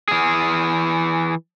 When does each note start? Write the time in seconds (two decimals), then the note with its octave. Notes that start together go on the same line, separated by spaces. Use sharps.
0.08 E3 G#4